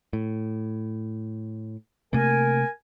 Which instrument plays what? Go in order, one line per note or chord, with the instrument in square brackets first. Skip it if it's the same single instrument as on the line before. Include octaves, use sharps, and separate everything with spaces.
[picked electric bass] A2
[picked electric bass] C3 A3 A#3 [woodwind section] A#4 G#5